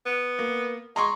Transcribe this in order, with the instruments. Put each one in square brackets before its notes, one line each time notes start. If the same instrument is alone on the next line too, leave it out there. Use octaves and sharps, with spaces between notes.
[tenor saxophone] B3
[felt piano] A#3
[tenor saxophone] G#3 [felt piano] A#5 C6 C#6